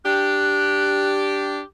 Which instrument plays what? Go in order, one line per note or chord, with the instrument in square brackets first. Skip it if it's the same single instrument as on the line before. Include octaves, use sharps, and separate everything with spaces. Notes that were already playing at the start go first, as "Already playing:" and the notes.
[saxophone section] D4 G4 [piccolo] F#6